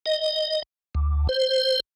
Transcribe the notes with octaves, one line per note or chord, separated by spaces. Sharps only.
D#5
D2
C5